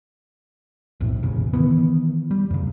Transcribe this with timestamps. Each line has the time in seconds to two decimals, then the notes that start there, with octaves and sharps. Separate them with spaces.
1.00 B1 F2 A2
1.23 E1 A1 A#2 C#3
1.53 D#3 E3 B3
2.31 G3
2.50 F2 C#3